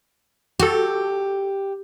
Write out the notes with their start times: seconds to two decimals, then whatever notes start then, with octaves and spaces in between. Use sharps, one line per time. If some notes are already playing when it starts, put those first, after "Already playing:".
0.60 F#4 G4 A4